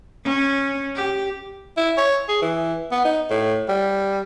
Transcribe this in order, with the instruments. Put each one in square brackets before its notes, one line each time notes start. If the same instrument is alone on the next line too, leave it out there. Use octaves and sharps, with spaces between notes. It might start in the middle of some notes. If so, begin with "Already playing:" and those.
[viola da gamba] C#4
G4
[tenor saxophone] E4
C#5
G#4
E3
B3
D#4
A2
G3